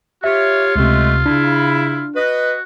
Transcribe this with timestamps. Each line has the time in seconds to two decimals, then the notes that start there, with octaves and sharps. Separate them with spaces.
0.24 F4 G4 C#5 E5
0.76 C#2 C3 G#3 A3
1.26 C#3 D4 E4
2.15 F#4 B4 D#5